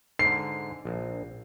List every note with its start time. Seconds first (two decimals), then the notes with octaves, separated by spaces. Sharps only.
0.19 G#2 D3 C7
0.85 A#1